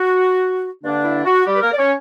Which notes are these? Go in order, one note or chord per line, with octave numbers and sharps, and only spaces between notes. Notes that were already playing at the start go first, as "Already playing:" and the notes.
Already playing: F#4
G2 D3 A#3 D4
E4
F#4
G3 G4
B4
A#3 A#4
D5
C#4 C#5